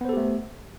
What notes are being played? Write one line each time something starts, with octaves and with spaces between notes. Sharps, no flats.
A3 B3 G4 A4 C5